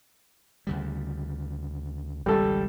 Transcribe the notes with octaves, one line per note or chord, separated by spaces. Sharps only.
D2 C#3 G3
G#1 C#2 B2 G3 A4